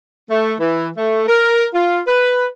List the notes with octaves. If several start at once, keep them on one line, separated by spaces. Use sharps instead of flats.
A3
E3
A3
A#4
F4
B4